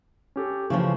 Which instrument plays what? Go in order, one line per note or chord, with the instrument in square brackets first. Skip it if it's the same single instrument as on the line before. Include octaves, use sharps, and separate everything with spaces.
[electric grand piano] C#4 G4 A4
[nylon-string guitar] C#3 F3 A3 [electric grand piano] E3